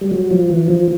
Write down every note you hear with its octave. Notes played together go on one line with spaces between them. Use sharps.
G3
F#3
F3
E3
F3